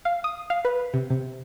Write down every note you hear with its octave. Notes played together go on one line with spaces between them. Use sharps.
F5
D#6
F5
B4
C3
C3